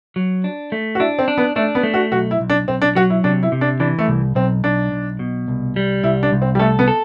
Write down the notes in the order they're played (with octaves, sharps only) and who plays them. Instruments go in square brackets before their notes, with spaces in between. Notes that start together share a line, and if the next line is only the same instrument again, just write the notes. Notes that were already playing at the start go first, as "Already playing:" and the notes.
[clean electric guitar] F#3
D4
A3
[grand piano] F#4
[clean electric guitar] D4 [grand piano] E4
[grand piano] C4
[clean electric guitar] D4
[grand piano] B3
[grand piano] A3 [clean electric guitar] D4
[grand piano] B3
[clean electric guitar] A3
[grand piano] F#4
[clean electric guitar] B1 [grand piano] F#4
[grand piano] E4
[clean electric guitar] B1
[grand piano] D4
[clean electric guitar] B1 [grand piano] C4
[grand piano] D4
[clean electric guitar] F#3 [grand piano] F#4
[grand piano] E4
[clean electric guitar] C3 [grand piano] D4
[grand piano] E4
[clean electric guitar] C3
[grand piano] D4
[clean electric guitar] E3 [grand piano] D4
[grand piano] A3
[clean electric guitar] C2
[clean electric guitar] B1 [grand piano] C4
[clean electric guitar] B1 [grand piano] D4
[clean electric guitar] B1
B2
C2
G3
[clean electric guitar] C2 [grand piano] E4
[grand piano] D4
[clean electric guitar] C2
[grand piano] C4
G3
[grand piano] A3 [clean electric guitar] A4
[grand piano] B3
[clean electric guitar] A4